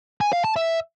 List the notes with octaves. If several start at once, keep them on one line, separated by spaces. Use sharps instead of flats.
G#5
F5
A5
E5